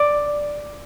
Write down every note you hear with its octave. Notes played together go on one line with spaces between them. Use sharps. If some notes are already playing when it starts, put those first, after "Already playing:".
Already playing: D5